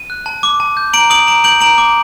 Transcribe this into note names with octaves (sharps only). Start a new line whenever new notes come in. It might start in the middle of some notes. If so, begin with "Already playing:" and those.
Already playing: D#7
F#6
A5
D6
A5
G6
A#5 D7 F#7
D#6 D7 F#7
A#5 D7 F#7
G6 D7 F#7
A#5 D7 F#7
D6